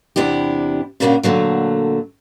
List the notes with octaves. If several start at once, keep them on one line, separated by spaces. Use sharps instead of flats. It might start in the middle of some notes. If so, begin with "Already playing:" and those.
E2 C3 D4 E4 G4
A#2 C#3 A#3 C#4 D4 F#4
A#2 D3 F#3 A3